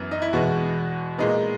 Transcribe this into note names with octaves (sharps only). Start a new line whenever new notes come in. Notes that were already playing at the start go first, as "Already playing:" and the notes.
Already playing: F#2 E3 B3
D#4
E4
E2 B2 G#3 B3 F#4
A#2 G#3 B3 D#4